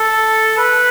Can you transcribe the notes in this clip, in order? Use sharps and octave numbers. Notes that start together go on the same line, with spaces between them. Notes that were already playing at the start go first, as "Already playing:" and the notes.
Already playing: A4
B4